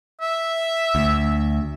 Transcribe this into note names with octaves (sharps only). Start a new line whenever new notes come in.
E5
D2